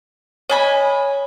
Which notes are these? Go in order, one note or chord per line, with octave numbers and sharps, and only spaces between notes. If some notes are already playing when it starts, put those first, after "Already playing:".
C#5 D#5 G#5 B5